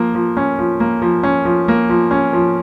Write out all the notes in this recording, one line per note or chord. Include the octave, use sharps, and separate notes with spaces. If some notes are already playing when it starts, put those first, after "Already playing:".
Already playing: F3 A#3
F3
C#4
F3
A#3
F3
C#4
F3
A#3
F3
C#4
F3